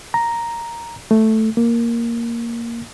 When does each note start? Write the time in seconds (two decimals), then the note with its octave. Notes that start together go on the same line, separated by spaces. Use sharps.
0.14 A#5
1.11 A3
1.57 A#3